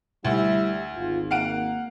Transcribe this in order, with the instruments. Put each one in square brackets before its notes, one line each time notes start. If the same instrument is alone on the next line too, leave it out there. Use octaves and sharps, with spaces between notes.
[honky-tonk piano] D2 [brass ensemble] G3 E5 [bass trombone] E4
[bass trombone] G#1 [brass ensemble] F4
[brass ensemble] A#3 [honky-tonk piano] F5 F#5 D7